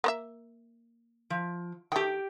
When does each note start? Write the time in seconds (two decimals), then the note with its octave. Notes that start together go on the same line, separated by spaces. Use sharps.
0.04 A#3 C5 E5
1.30 F3
1.92 D#3 A3 G4 G5